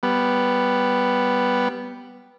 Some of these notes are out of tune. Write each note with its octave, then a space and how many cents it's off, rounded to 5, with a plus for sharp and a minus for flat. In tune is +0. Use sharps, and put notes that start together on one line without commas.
G3 +0 B3 +0